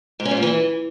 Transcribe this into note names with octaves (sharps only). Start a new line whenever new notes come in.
G#2
C#4
G#2
A#2
E3